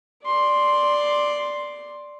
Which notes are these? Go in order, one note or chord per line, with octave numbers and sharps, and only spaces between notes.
D5 C6